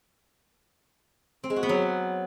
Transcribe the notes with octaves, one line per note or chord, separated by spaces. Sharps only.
C4
G#3
F#4
B3
F#3